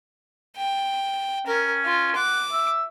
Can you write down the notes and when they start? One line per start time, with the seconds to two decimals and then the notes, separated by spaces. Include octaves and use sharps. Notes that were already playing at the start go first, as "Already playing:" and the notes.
0.57 G5
1.47 C#4 A#4
1.85 F4
2.16 F#5 D6
2.52 E5